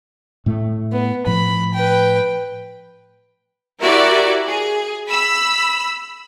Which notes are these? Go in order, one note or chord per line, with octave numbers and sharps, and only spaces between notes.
A2 A3
B3
A2 F3 B5
B4 G5
E4 F#4 G4 A#4 D5 E5
G#4
B5 E6 B6